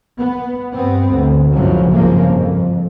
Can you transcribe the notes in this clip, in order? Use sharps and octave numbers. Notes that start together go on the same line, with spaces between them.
B3
G2 B3 C4
D2
C#2 F#2 A2 C#3 F3 F#3
G1 C2 G#2 C#3 F3 A#3
F2